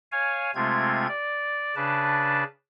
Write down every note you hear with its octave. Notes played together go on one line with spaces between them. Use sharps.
C#5 F5 G#5
C3 G#3 A3 C4 F4 G#6
D5
C#3 D4 B4 A5